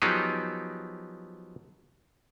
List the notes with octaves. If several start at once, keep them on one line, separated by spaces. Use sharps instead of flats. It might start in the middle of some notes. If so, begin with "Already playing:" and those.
F3 F#3 B3 D#4 G4 G#4